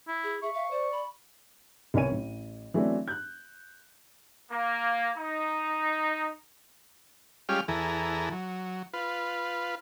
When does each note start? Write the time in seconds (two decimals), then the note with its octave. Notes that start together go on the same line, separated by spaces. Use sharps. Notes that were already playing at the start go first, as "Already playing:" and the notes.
0.08 E4
0.24 G#4
0.42 G#4 E5 C#6
0.54 E5 F5
0.71 C5 D5
0.92 B5
1.94 C2 B3 A#4 C#5 G#5 D#7
2.11 A1
2.74 E3 F#3 A3 B3 C4 D4
3.08 F#6 G6
4.51 A#3
5.18 D#4
7.49 G3 G#3 C#4 F4 G4 F6
7.68 E2 E3 G#4 A4 A#5
8.32 F#3
8.94 F4 B4